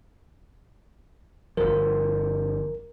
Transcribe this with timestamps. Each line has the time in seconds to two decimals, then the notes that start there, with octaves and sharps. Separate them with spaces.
1.57 G1 F3 A#4